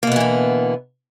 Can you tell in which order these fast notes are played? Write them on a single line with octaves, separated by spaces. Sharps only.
A#3 B2 B3 E3 D3